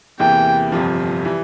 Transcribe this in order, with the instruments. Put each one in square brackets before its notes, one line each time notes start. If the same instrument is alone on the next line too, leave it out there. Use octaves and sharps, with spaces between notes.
[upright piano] E2 C3 E3 A#3 [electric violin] G5
[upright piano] G1 F2 C3 F3
E3 G3